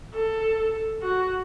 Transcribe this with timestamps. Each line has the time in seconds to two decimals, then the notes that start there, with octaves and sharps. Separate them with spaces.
0.14 A4
1.02 F#4